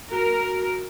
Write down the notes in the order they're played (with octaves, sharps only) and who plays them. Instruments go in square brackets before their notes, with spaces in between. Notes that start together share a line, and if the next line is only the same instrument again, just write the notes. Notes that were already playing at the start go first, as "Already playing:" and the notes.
[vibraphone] F#4 [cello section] A#4